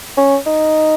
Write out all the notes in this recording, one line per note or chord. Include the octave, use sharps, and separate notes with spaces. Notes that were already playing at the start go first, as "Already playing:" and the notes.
C#4
D#4